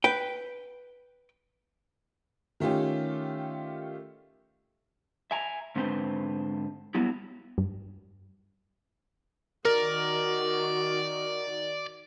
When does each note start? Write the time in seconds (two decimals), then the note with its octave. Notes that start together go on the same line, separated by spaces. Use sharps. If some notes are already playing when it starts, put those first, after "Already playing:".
0.04 B4 G5
2.60 D#3 A3 C#4 F4 G4
5.31 E5 G#5 A#5
5.76 G#2 D3 C4 B4 C5
6.95 F#3 G3 B3 E4
7.58 G2
9.65 D#3 F#4 A#4 D5